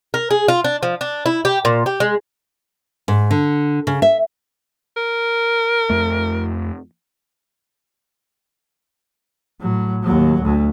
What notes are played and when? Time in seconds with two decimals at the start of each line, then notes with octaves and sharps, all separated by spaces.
0.14 A#4
0.31 G#4
0.48 F4
0.64 D4
0.83 F3
1.01 D4
1.26 E4
1.45 G4
1.65 A#2
1.86 G4
2.00 G#3
3.08 G#2
3.31 D3
3.87 C#3
4.02 E5
4.97 A#4
5.90 F2 A3
9.61 A2 F#3
10.03 D#2 F#3
10.42 D2